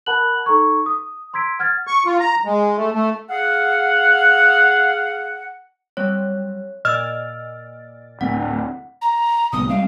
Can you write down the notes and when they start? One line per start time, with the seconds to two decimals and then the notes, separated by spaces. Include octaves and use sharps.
0.06 A#4 F#5 A5 B5 F#6 F#7
0.45 D#4 A4 A#5 C#6 G#6
0.86 D#6
1.33 A#5 C6 E6 G#6 B6 D7
1.59 F#5 F6 G#6 A6
1.87 C#6
2.06 F4
2.20 A#5
2.45 G#3
2.77 A3
2.93 A3
3.29 G#4 F5 F#5
5.97 F#3 G3 C4 C#5
6.85 A#2 D5 D#5 E6 F6 A6
8.21 D1 C4 F#5
9.02 A#5
9.52 D1 C2 B3 D#6
9.69 G3 G#3 C4 F5